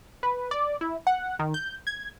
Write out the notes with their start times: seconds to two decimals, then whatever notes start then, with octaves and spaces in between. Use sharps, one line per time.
0.23 B4
0.51 D5
0.81 E4
1.07 F#5
1.39 D#3
1.54 G6
1.87 G#6